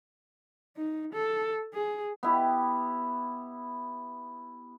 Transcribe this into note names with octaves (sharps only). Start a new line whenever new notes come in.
D#4
A4
G#4
B3 E4 G4